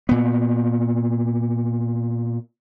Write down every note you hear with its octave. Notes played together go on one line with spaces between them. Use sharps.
A#2 B3